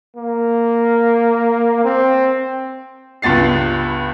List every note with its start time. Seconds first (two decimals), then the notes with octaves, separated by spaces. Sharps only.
0.16 A#3
1.84 C4
3.22 C#2 G2 B3 A6 C7